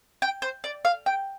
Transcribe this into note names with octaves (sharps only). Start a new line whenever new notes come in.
G5
C5
D5
F5
G5